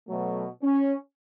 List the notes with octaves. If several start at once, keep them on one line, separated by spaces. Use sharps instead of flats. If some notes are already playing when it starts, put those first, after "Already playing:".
B2 F#3 A3
C#4